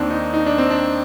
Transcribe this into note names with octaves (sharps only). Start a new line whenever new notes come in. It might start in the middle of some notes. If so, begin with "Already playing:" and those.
Already playing: D#2 D#3 C4 D4
D#4
D#4
D4
C4
D4